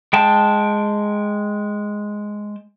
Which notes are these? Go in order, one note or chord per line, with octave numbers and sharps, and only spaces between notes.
G#3 G5 A5